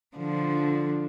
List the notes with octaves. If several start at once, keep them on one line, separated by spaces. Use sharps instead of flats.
D3 F3